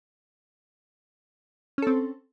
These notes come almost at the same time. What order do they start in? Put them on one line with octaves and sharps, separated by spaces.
C#4 A4 C4